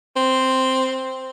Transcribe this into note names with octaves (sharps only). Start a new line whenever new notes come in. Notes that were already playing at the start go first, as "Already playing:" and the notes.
C4